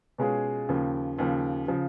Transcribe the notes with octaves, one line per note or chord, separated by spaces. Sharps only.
B2 G#3 C#4 F4 G#4
D#2 C#3 F3
D#2 C#3 F3
C#3 F3